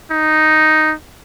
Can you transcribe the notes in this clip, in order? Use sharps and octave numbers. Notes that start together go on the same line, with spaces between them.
D#4